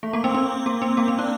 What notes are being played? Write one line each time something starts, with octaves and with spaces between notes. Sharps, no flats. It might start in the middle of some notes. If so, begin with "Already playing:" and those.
A3
A#3
C4
C4
A#3
C4
A#3
C4
D4